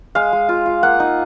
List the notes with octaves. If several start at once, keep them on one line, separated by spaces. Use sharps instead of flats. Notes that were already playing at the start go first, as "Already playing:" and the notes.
G#3 F5
G#3
F4
F4
A#3 F#5
D#4